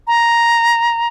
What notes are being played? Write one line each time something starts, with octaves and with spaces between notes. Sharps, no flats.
A#5